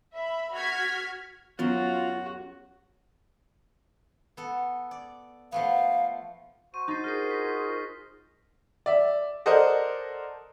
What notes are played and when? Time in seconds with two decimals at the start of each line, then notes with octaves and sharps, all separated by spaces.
0.14 E5 B5
0.55 F#4 F6 G#6 B6
1.59 F#2 F#3 B3 F4 F#4 C6
4.37 B3 A4
4.91 D5
5.52 F3 A3 B3 F5
6.74 F#4 C5 C#6 D#7
6.88 D#4 G6 A6 C7
7.04 F4 G#4 A#4 F6 A#6 C7
7.31 B6
8.86 D5 E5
9.46 A4 A#4 C5 D5 D#5 F#5